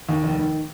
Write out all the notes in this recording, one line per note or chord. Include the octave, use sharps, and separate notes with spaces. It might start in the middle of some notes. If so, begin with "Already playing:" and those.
D#2
F1
D#3